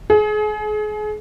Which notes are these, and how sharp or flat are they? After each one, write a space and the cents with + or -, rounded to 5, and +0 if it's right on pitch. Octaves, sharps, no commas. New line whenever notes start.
G#4 +35